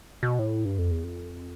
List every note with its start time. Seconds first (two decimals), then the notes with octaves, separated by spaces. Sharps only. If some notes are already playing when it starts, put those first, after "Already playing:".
0.23 B2
0.39 A2
0.65 G2
0.79 F2
0.91 E2
1.04 F2